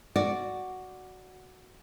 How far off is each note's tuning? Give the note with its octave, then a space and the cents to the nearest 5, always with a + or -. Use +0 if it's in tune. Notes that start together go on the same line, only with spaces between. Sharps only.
F#4 +0 D5 +0